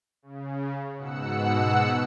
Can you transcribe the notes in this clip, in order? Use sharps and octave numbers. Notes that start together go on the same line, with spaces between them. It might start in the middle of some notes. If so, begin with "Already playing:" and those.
C#3
G#2 B2 F#5 E6 C#7